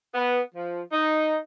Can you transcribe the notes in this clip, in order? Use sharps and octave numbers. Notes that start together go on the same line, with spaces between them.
B3
F3
D#4